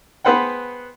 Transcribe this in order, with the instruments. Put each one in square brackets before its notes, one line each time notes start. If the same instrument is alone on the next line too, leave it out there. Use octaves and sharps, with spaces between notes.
[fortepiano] B3 G#4 B4 C5 F#5 G5